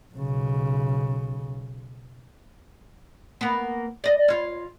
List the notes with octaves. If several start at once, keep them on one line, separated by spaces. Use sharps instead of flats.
B1 C#3
A#3 B3
D5 D#5
F4 C#5